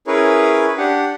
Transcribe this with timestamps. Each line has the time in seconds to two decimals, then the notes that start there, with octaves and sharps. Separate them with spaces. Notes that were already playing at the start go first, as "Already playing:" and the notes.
0.07 C#4 E4 G#4 A#4 B4 C#5
0.78 D4 G4 F#5